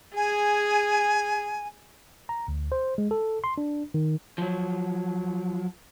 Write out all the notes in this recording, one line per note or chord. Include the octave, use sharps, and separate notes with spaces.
G#4 G#5
A#5
D2
C5
G#3
A4
C6
D4
D#3
F3 F#3